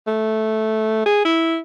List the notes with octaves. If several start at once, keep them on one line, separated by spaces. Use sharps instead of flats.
A3
G#4
E4